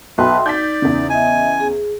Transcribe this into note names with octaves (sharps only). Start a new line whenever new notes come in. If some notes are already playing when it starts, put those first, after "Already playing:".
B1 B4 E5 G5 C6
D#4 D5 G6 A6 B6
E2 C#3
D#5 E5 G#5
G#4